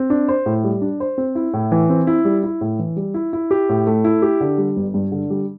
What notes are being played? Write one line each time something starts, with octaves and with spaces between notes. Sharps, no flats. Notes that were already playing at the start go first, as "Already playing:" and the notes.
Already playing: C4
D4
C5
A2
G3
D4
C5
C4
E4
A2
E3
C4
E4
G3
E4
A2
E3
G3
E4
E4
G4
A2
A3
E4
G4
D3
G3
G1
G2
D3
G3